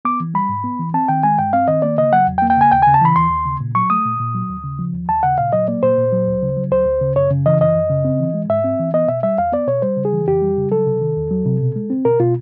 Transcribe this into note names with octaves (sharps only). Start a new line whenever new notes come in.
B3 D6
E3
G3 B5
G#2
B3
E3
C4 A5
D#3 G5
G#3 G#5
G2 G5
C4 F5
D#3 D#5
A#3 D5
C#3 D#5
F#3 F#5
E2
G5
A#3
G5
C#3 G#5
D#2 G5
C#3 G#5
A5
E3 B5
D#2 C6
D#2
C#3
A#2
F#3 C#6
A3 D#6
A#2
A#2
F#3
D#2
C#3
F3
D#2
D#2 A5
C#3 F#5
A#2 F5
F#3 D#5
A#3 D5
A#2 C5
A#2
F#3
D2
C#3
F#3
D2 C5
D2
C#3
F#2 C#5
C#3
E3 D#5
F#2 D#5
F#2
C#3
C4
E3
G#3
G#2 E5
C4
E3
B3 D#5
B2 E5
G3 E5
E2 F5
B3 D5
B2 C#5
G3 C5
C#3
G#4
E3
F2 G4
G3
C#3
F#3 A4
C3
D#3
E2
F#3
C3
B2
G#3
C4
B2 A#4
B2 F4